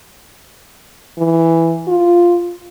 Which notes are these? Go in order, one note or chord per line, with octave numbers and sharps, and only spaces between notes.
E3
F4